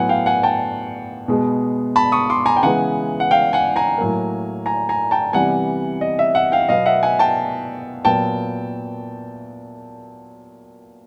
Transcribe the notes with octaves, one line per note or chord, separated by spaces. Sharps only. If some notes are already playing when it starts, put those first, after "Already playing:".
Already playing: A2 F#3 B3 F#5 G#5
F5 G5
F#5 G#5
G5 A5
B2 G#3 B3
A5 B5
C#6 D#6
C6 D6
G#5 A#5
G5
C#3 E3 G#3 B3 F#5 G#5
F#5
F5 G5
F#5 G#5
G#5 A#5
A2 F#3 A#3
G#5 A#5
G#5 A#5
G5 A5
C3 E3 G3 B3 F#5 G#5
D#5
E5
E5 F#5
F5 G5
B2 F#3 B3 D#5 F5
E5 F#5
F#5 G#5
G5 A5
A#2 F#3 B3 G5 A5